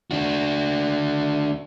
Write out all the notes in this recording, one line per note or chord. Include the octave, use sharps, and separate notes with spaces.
D4 F#4